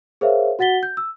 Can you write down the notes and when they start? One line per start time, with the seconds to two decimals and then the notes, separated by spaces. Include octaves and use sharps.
0.21 G#4 A#4 C5 C#5 E5 F5
0.59 F#4 F#5 A6 B6 G7
0.83 G6
0.97 E6